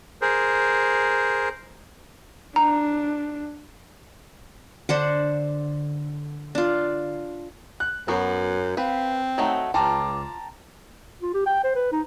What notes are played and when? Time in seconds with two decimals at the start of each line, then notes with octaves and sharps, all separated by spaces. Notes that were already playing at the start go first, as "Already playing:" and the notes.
0.22 G#4 A#4 C5
2.56 D4 A#5
4.89 D3 D4 C5 F#5
6.55 D4 F4
7.80 F#6
8.08 F#2 F#3 B3 F#4
8.77 C4 B4 F5
9.38 F#3 A3 D#4 F#5
9.74 C#2 F4 G5 A5 A#5 D6
11.22 F4
11.34 G4
11.46 G5
11.64 C5
11.75 B4
11.92 D#4